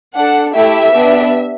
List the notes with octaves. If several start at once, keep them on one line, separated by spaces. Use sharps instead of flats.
D4 A4 F#5
A3 E4 G4 E5
B3 D4 G4